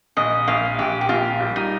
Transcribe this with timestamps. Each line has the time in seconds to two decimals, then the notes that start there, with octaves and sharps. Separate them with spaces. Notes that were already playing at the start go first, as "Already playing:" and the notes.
0.17 A#1 D#5
0.48 A#1 F5
0.78 A#1 G4
1.01 G4
1.09 A#1 F4
1.41 G3
1.56 D#4